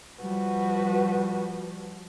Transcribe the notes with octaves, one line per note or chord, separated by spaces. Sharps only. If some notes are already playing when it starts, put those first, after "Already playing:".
F3 G3 F#4 B4